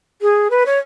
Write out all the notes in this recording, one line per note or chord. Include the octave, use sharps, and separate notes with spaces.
G#4
B4
C#5